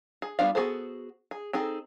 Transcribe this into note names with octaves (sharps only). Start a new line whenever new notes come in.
G#4
G3 B3 D4 F4 F5
B3 F#4 G#4 A4 C5
G#4
C4 D#4 G#4 A4